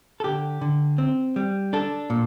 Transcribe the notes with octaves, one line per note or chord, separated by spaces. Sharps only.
A4
D3 G4
D3
C4
G3
D4 A4
A#2